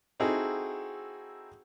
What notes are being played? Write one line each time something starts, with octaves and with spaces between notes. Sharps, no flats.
C4 D#4 E4 F#4 G#4 A4